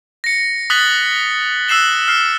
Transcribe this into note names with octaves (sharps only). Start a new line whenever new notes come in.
A#6 C#7
D#6 F#6 A6 B6 F#7 G7
E6 F#6 C7 E7 G7
F6 C7